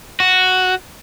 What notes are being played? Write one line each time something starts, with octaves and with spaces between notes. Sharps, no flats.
F#4